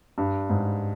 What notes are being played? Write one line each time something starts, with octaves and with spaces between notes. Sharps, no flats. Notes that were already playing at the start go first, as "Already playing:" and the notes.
G2
G#2